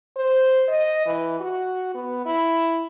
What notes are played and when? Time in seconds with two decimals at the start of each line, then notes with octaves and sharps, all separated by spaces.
0.16 C5
0.68 D#5
1.06 E3
1.40 F#4
1.95 B3
2.26 E4